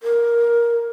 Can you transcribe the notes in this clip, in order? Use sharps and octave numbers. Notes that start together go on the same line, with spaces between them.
A#4